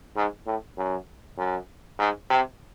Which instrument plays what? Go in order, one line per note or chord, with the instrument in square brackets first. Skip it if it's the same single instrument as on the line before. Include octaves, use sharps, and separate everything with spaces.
[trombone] G#2
A2
F#2
F#2
G#2
C3